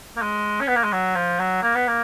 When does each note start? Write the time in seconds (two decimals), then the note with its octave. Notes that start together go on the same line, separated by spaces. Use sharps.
0.17 A#3
0.22 G#3
0.60 C#4
0.67 B3
0.76 A#3
0.84 G#3
0.92 F#3
1.15 F3
1.39 F#3
1.62 A#3
1.75 B3
1.88 A#3